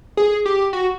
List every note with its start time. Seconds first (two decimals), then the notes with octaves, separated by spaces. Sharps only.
0.17 G#4
0.46 G4
0.73 F#4